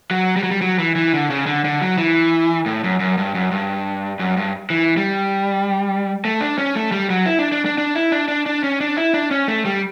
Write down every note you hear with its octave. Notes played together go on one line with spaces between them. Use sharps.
F#3
G3
F#3
G3
F#3
E3
E3
D3
C#3
D3
D3
F#3
E3
A2
F#2
F#2
G2
F#2
G2
F#2
G2
E3
G3
A3
D4
C#4
A3
G3
F#3
E4
D4
D4
D4
D4
E4
D4
D4
D4
C#4
D4
E4
D4
C#4
A3
G3